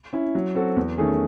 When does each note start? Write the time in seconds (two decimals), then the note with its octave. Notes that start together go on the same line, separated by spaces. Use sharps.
0.13 C#4 E4
0.35 F#3
0.55 C4 F#4 A4
0.76 E2
0.98 D#3 A3 C#4 G#4